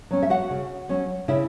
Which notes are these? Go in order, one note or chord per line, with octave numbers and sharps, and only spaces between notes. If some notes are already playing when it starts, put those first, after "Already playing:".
F#3 C#4
E5
F#4 F#5
C#3
F#3 C#4
C#3 E4 E5